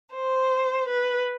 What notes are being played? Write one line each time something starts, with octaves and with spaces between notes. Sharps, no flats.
C5
B4